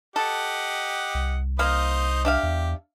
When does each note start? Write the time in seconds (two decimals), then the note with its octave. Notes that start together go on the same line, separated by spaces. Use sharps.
0.16 G4 A4 D#5 F#5
1.14 C2
1.59 A#3 D#4 C5 F5 D#6
2.25 D4 G4 E5 F5
2.43 E2